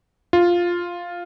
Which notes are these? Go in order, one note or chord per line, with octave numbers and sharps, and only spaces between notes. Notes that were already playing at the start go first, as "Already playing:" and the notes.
F4